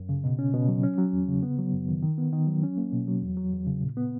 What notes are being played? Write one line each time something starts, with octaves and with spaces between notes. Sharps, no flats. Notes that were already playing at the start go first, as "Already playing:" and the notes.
Already playing: F#2
C#3
B2
C#4
B2
F#3
C#4
F#3
E2
C#3
B3
F#3
F#2
D#3
D#3
B3
D#3
F#3
C#4
A#3
B2
F#3
E2
F#3
E2
C#3
A#2
B3